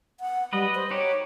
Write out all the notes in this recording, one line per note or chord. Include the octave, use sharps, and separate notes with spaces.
F#5
G3 B4 D#5
C5
D#4 F#4 G4 C#5